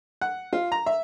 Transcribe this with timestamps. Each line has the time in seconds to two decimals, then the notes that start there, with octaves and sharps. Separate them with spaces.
0.21 F#5
0.53 F4
0.72 A#5
0.86 E5